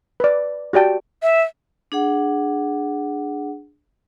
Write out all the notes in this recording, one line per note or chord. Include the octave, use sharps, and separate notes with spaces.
B4 D5
F#4 G4 D5 G5 A5
E5
D4 G#4 F#5